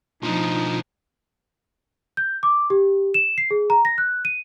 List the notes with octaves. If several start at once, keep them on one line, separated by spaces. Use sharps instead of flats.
B2 F3 A3 D4 D#4 F4
G6
D6
G4
E7
C7
G#4
A#5
A#6
F#6
D#7